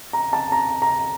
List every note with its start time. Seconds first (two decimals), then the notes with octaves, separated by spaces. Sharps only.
0.13 A#5
0.33 A5
0.52 A#5
0.82 A#5